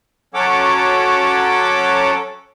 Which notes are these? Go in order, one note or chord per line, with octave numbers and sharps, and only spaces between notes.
F#3 C#4 A4 C#5 F#5 D6